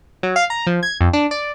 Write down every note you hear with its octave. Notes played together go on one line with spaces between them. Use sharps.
F#3
F5
A#5
F3
G#6
F2
D4
D5